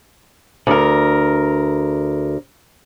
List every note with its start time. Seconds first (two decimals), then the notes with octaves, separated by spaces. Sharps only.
0.67 D2 A#4